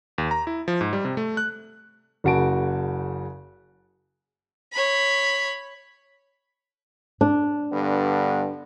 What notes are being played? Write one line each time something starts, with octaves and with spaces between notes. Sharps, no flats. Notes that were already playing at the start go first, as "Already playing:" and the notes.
D#2
A#5
E4
F3
G#2
G3
C3
A3
F#6
F#1 C#3 F#4 A5 D7
C#5 B5
D4
G2 D3 B3